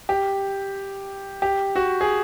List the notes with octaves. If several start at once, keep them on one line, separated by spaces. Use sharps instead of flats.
G4
G4
F#4
G#4